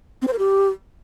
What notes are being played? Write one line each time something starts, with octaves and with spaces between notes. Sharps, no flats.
C4
C5
A#4
G4